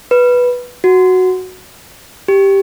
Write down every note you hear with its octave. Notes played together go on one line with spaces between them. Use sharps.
B4
F#4
G4